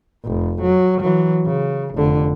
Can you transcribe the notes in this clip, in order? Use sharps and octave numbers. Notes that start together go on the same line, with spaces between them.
F1
F#3
E3 F#3
C#3
F1 D3